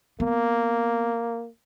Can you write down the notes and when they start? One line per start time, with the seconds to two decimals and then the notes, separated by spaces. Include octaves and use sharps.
0.20 A#3 B3